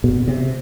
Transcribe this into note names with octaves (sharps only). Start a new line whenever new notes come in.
B2
C3